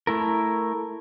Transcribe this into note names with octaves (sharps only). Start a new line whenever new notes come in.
A3 E4 A#4